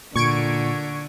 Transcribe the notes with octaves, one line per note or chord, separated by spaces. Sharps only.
A#2 D3 C#6 G#6 D7